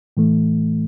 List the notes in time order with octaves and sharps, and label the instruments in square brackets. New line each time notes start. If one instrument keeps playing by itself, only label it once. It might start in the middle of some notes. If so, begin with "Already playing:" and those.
[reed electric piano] A2 E3 A3